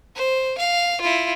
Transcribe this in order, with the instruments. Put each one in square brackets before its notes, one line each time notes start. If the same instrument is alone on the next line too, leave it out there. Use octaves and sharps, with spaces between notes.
[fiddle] C5
F5
E4 F4